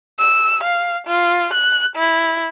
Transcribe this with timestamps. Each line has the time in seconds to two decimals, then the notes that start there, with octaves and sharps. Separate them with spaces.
0.19 E6
0.64 F5
1.07 F4
1.54 F#6
1.96 E4